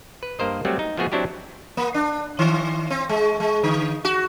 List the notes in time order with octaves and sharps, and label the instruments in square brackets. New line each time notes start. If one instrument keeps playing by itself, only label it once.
[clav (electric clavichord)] B4
G2 A#3 A#4 C5 D#5
F#3 G3 A3 C4 F#4
D#4
F3 A3 B3 F#4 G#4
F#3 C4 D4 E4 F#4 G4
[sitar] A#3
D4
D#3
C4
G#3
G#3
D3
F#4